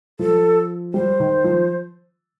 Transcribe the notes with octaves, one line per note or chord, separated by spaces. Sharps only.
F3 A4
G3 C5
D#3
F3